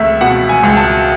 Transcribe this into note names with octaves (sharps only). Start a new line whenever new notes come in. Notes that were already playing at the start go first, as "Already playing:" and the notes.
Already playing: C#2 A3 E5
B2 F#5
G#5
C#2
A5